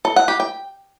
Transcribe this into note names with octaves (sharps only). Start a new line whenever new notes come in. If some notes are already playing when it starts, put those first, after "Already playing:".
A4
F#5
G4
G5